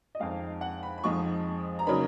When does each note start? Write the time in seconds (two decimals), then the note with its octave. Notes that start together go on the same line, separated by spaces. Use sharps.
0.15 D#5
0.19 F2 D#3 G#3 D#4 F5
0.61 F#5
0.83 B5
0.98 B5
1.03 F2 F3 G#3 D#4 C#6
1.79 A#5
1.86 C#3 F#3 A#3 D#4 B5